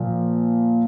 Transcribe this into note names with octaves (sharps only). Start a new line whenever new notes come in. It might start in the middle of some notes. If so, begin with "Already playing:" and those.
Already playing: A#2 F3